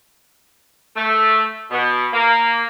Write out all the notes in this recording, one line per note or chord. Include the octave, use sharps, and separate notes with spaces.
A3
B2
A#3